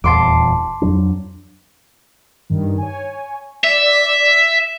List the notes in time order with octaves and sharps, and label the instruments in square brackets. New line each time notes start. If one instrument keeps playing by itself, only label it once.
[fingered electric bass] D#1 E2 [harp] A5 C6 D6
[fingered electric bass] F2 F#3 D4
[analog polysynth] G2 D#3
C#5 G#5
[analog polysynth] D5 [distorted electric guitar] E5